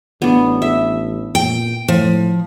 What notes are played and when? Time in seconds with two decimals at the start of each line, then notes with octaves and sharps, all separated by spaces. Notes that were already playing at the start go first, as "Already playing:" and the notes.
0.22 A1 B3 D4
0.62 E5
1.35 A#2 G5
1.88 A2 F3